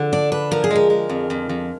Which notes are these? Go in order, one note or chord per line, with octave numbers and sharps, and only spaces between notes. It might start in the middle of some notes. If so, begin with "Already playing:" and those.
Already playing: D3 F3
D4 D5
D4 B4
F3 A#4
G#4
G#3 A#4
G#3
F2
F2
F2